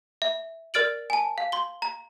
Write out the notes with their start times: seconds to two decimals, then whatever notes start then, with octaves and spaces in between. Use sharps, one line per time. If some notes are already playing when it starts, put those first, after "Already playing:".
0.22 E5
0.74 A#4 D5 F6 A6 D7 F#7
1.10 G#5 A5
1.38 F5
1.52 C6 G7
1.82 A#5